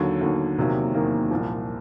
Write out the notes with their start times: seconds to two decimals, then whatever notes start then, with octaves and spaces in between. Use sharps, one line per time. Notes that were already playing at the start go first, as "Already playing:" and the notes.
Already playing: D#2 D3 F#3
0.21 D#2 D3 F#3
0.58 E2 C3 D#3 F#3 A#3
0.94 E2 C3 D#3 F#3 A#3
1.30 C2 A#2 F3